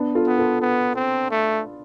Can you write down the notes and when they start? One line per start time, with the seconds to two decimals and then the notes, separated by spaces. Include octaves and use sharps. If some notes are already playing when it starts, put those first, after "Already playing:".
Already playing: B3 D4
0.15 F4 A4
0.27 B3
0.39 F4 A4
0.61 B3
0.96 C4
1.31 A3